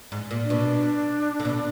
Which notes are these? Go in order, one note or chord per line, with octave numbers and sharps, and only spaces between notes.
G#2
A#2
D4
B2
D3
B2